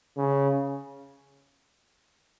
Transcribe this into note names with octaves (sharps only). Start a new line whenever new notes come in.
C#3